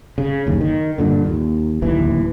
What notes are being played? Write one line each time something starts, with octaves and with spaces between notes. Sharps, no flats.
C#3
F#1 D#2
D#3
G2 A#2 D3
D#2
D1 D#2 E3